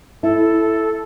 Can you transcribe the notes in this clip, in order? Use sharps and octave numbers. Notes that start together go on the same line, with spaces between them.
E4 A4